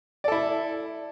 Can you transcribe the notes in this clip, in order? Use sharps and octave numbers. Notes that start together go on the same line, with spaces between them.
E4 A4 D5